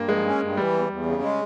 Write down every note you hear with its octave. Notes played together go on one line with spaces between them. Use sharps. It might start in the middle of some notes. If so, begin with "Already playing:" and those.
Already playing: G2 A#3
F3 G#3
C#4
G2
E3 G3
E2
E2
C#3
G#3